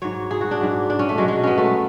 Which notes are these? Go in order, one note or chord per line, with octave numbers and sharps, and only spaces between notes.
G#2 F#3 C#5
G#4
F#4
D4
G#2 F#3
D4
C#4
A3
B2 F#3 G#3
G#3
B3 C#4
A3